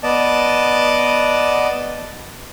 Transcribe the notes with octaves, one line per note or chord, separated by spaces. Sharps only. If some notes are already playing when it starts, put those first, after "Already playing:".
B3 D5 D#5 A5